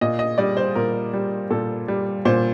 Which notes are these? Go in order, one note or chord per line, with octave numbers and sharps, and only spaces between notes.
A#2 D#5
D#5
G3 D5
C5
A#2 A#4
G3
A#2 A4
G3
A#2 C5